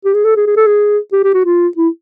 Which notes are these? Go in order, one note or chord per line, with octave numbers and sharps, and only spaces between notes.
G4
G#4
A4
G#4
G#4
A4
G#4
G4
G4
F#4
F4
E4